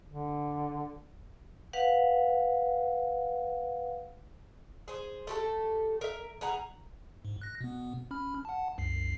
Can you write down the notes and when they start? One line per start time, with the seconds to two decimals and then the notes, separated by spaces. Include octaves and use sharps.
0.08 D3
1.73 B4 F5 F#5
4.88 G#4 C5
5.27 A3 G4 A4
6.01 A#4 E5
6.41 B2 G#4 F#5 A#5
7.25 G#2
7.41 F#6 A#6
7.61 B2 B3
8.11 C#4 B5 F6
8.45 F#5 A5
8.78 C2 F#2 C7